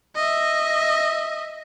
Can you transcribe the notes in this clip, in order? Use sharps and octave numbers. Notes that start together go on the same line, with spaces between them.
D#5 E5